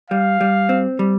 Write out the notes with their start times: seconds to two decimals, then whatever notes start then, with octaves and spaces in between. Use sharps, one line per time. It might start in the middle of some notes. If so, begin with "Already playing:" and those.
0.10 G3 F5
0.41 G3
0.69 C4
0.99 G3